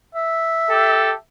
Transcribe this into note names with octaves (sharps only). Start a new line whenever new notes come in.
E5
G4 A4